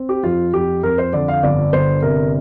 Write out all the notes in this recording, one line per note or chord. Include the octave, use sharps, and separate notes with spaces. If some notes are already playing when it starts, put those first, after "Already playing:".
Already playing: C4
G4
F2 F4
F2 G4
F2 A#4
C5
D3 D5
F5
G1 D5
G1 C5
C3 A#4